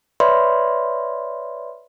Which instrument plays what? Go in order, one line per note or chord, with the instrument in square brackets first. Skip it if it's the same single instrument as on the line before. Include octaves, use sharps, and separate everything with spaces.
[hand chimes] B4 C#5 D5 E5 B5 C6